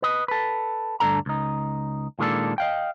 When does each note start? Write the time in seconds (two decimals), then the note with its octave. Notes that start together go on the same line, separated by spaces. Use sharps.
0.02 B4 D#5
0.28 A4 B4
1.00 D2 G2 A#2 D4 A4 A#5
1.26 C#2 D#4
2.19 A#2 D#3 G#3 A#3 D4 A4
2.58 D#5 F5 G5